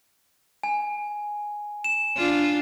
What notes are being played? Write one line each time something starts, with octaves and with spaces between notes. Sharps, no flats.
G#5
E7
D4 F4